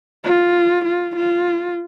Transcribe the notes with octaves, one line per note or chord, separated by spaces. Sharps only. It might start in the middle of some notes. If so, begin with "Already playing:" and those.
F4
F4
F4